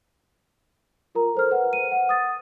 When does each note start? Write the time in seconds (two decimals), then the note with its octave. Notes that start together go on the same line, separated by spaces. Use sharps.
1.15 F4 A#4 A#5
1.35 A4 C5 F6
1.51 B4 F#5
1.73 D#7
1.91 F#5
2.09 D#6 A6